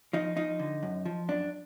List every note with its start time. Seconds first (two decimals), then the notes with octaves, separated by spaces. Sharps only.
0.13 F3 D#4
0.37 F3 D#4
0.59 D3
0.83 F#2
1.05 F3
1.29 F#2 D4